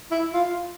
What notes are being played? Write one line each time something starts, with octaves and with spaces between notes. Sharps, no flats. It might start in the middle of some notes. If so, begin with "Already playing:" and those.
E4
F4